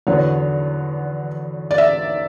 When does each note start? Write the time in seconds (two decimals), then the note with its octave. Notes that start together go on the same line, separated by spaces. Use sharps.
0.07 E2 D3 F#3 B3 C#5
1.71 D5
1.78 E5